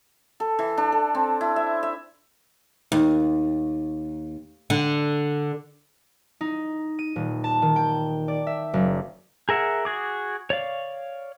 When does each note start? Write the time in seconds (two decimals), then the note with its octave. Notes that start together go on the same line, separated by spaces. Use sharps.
0.40 A4
0.59 E3
0.78 D4
0.92 A4
1.15 C4
1.41 E4
1.56 E5
1.83 E5
2.92 D#2
4.70 D3
6.41 D#4
6.99 D#7
7.16 D#1
7.44 A5
7.62 D#3
7.76 G5
8.28 D5
8.47 E5
8.74 F#1
9.49 G#4 A#4 E5 F#5
9.85 F#4 G#4 D6
10.50 C#5 D5 F5